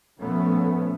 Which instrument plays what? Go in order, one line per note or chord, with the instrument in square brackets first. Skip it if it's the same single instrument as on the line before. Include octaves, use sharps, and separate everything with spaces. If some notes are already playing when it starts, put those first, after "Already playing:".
[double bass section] A#2 F3 A3 B3 C#4